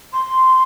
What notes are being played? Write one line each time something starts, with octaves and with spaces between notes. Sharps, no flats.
C6